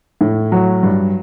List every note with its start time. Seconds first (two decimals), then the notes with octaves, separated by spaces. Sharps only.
0.21 A2
0.52 F#3
0.83 G2